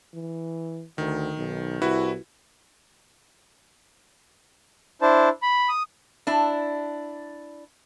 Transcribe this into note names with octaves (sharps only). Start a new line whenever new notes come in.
E3
D2 D#3
B1
C2 E4 F#4 B4
D4 E4 C5 A5
B5
D#6
D4 E4